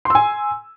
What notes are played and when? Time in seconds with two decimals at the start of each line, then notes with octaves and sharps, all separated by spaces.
0.05 C6
0.10 E6
0.15 G#5